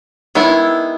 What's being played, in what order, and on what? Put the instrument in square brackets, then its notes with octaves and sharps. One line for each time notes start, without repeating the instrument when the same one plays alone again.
[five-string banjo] D#3 G#3 B3 E4